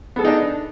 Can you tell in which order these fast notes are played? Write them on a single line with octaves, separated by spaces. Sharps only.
B3 A4 G#4 D#4 D4